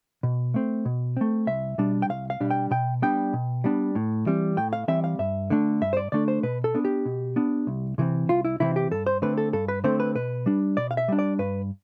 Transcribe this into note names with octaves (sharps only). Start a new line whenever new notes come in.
B2
A3 C4
B2
A3 C4
C2 E5
B2 G3 D4
G5
C2 F5
F5
B2 G3 D4
G5
B2 G5
G3 B3 D4 G5
B2
G3 B3 D4
A2
E3 G3 C4
A2 G5
F5
E3 G3 C4 E5
F5
G2 E5
D3 A3 D4
G2 E5
C5
D5
D3 A3 D4 D5
C5
B2 B4
A4
B3 D4
G4
B2
B3 D4
C2
C3 E3 A3 C4
C2 F4
E4
C3 E3 A3 C4 E4
G4
G2 A4
C5
D3 A3 C4 B4
A4
G2 A4
B4
D3 A3 C4 C5
B4
B2 B4
G3 D4
B2 D5
F5
E5
G3 D4
D5
G2 B4